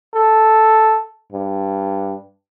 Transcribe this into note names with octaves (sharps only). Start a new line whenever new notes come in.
A4
G2